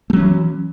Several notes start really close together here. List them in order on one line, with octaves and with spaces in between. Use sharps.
A3 F#3 C#4 E3